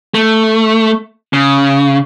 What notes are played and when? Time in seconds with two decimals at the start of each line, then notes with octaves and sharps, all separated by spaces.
0.14 A3
1.33 C#3